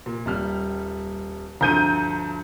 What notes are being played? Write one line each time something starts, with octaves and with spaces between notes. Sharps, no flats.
A#2
D#1 G3 F6
D2 G2 F3 A#5 G6 D#7